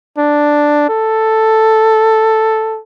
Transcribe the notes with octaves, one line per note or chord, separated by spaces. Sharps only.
D4
A4